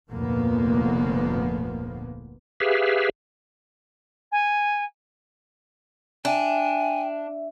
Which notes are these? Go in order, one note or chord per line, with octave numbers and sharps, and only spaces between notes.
F1 D2 A#2 F3 A#3 B3
G4 G#4 B4 E5 F5
G#5
D4 E5 G5 G#5